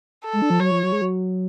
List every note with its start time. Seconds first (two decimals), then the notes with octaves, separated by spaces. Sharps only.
0.24 A4
0.33 G#3
0.42 D4
0.50 F3
0.60 F#3 C#5
0.71 F3
0.83 F#3
0.92 G#3
1.02 F#3